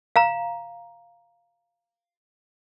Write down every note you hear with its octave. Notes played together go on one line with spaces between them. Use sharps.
F5 A#5